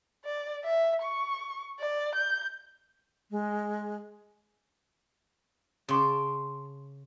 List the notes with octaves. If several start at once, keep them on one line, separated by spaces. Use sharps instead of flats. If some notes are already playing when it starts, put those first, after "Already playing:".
D5
E5
C#6
D5
G6
G#3
C#3 A5 C6 D6